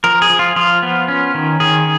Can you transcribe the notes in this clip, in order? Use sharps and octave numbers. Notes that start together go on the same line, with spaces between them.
F3 A#4
G#4
F3
F4
F3 F4
B3
C#4
D#3
D#3 G#4